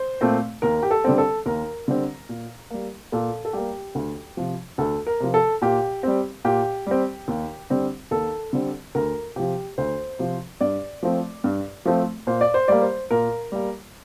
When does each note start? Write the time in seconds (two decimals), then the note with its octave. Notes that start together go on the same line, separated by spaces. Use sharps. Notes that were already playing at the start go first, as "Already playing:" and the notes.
Already playing: C5
0.21 A#2 A3 C4
0.62 D#2 A#4
0.83 G4
0.91 A4
1.04 D3 G3 C4
1.18 A4
1.46 D#2 A#4
1.88 D3 G3 C4
2.29 A#2
2.70 G3 A#3
3.12 A#2 A4
3.45 A4
3.53 G3 A#3 G4
3.95 D2
4.37 C3 F3
4.78 D2 A4
5.07 A#4
5.20 C3 F3
5.34 A4
5.62 A#2 G4
6.03 G3 C4
6.45 A#2 G4
6.87 G3 C4
7.28 D#2
7.70 D3 G3 C4
8.11 D#2 A4
8.53 D3 G3 C4
8.95 D2 A#4
9.36 C3 F3 G4
9.78 D2 C5
10.19 C3 F3
10.61 G2 D5
11.03 F3 A3 C4
11.44 G2
11.86 F3 A3 C4
12.27 A#2 C5
12.41 D5
12.54 C5
12.68 G3 A#3 D5
12.82 C5
13.11 A#2 A#4
13.52 G3 A#3